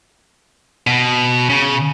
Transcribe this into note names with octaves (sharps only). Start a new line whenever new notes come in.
B2
C#3